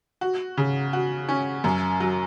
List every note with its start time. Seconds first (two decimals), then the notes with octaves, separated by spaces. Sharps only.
0.21 F#4
0.57 C#3
0.93 F#4
1.29 C#4
1.64 F#2
2.00 F#3